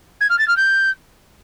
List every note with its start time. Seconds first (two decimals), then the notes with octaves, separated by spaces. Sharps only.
0.21 G#6
0.30 F6
0.39 A6
0.48 F6
0.57 G6